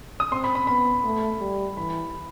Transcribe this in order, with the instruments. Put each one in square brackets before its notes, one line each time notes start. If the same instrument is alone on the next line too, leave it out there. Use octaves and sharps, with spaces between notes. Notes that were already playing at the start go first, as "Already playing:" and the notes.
[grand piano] D#6
[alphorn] C4 [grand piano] C6
[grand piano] B5
B5
[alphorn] B3 [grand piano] B5
[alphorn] A3
G3
[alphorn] E3 [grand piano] B5